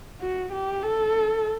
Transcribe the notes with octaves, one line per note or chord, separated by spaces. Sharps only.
F#4
G4
A4